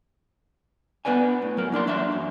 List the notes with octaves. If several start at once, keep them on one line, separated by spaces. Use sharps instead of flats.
B3 D4 B4 D5 G#5
A2
F#3 A#4
A#3 D4 D5 C6
E2 F#3 D4 E5 B5 C6
F#2